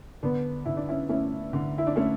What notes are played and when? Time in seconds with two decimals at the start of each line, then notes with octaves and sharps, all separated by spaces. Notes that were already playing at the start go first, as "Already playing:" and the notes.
0.23 D3 B3 D4
0.65 D3 E4
0.77 D4
0.89 C#4 E4
1.09 A3 C#4 E4
1.53 D3
1.78 E4
1.87 D4
1.96 A3 C#4